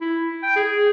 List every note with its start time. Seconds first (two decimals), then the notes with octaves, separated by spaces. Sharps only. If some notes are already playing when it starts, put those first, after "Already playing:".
0.01 E4
0.43 G5
0.56 G#4